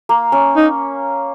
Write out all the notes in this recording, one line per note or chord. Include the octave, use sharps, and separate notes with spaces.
A#3
C#4
D#4